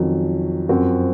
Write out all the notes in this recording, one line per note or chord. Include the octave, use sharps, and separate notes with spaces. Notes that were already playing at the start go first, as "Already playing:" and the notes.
Already playing: F2 D#3 F#3 C#4
F#2 F3 C4 F#4